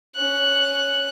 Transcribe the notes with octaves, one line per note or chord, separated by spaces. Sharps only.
C#4 F#6